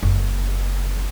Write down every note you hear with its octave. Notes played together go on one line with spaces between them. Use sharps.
F#1